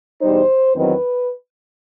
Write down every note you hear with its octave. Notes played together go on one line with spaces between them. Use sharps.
E2 B2 G3 D#4 C5
E2 D#3 F#3 C4 D#4 B4